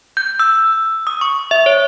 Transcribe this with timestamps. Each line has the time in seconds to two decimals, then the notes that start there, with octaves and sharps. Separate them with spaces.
0.17 G6
0.39 E6
1.07 D#6
1.21 C#6
1.51 E5
1.66 C#5